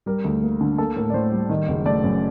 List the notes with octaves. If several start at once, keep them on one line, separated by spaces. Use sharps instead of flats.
G3 A#4
D2
A#3
D3
A#3 A4
A2 A#4
D5
A2 C5
G3
D#3
F#1
A3 D5
F#2